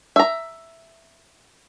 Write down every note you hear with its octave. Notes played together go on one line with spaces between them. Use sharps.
E5 A#5